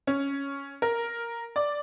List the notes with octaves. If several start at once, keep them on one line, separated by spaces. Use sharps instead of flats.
C#4
A#4
D5